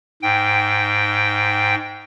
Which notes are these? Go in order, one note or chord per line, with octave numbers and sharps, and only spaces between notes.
G#2 G5